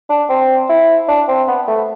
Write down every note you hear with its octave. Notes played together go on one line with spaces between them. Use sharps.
D4
C4
E4
D4
C4
B3
A3